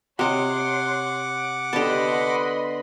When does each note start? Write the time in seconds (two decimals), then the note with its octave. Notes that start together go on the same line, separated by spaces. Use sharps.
0.19 C3 C#5 D#5 F#5 C6 D6
1.73 D3 B3 G4 D#5 A5 B5 C6